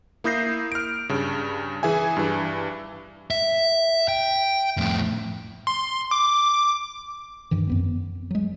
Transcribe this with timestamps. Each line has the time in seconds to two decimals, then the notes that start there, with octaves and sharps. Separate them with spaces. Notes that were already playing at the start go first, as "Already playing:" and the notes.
0.24 A#3 E4 D#6 G6 A#6 C7
0.72 F6 D7
1.09 G2 C#3
1.83 E3 G#4 E5 G#5
2.17 G2 E3
3.31 E5
4.08 G5
4.77 F2 A2
5.67 C6
6.11 D6
7.51 G2 D#3 E3
7.67 F#2 B3 C4
8.31 F#3 G#3